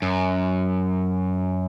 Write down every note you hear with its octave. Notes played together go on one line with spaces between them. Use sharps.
F#2